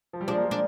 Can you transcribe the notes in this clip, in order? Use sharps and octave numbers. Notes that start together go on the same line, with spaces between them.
F3
G3
F3 G#3 D4
A#3
F3 G#3
D4